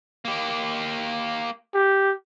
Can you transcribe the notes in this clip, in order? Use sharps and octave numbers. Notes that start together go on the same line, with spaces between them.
A#3 G4
G4